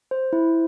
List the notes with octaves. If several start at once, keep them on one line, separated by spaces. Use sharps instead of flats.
C5
E4